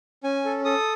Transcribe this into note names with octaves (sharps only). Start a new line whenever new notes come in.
C#4 G#5
A4
A4 D#6